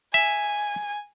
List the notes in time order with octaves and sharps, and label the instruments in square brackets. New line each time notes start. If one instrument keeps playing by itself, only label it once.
[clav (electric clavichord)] E5 [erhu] G#5